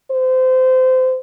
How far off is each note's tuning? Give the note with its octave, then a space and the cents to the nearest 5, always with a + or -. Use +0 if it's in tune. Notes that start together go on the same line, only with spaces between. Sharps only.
C5 -25